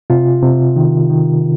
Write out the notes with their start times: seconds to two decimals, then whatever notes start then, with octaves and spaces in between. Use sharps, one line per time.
0.10 C3 F4
0.43 C3
0.76 D#3
1.10 D#3